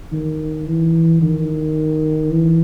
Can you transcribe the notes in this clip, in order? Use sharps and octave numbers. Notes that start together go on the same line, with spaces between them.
D#3
E3
D#3
E3